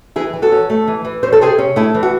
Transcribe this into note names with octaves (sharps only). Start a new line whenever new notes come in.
E3 E4 G#4
E3
F#4 A4
C#4
A3
E3
E3
C#4 C5
A4
C3 G#4 C5
C#4
A3 E4 G#4
E3
F#4